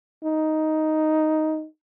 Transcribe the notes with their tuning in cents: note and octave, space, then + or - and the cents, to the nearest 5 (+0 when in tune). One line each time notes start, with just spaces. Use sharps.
D#4 +5